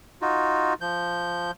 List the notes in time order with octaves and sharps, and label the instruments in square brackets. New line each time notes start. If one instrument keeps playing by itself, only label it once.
[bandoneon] D#4 F4 F#4
F3 G6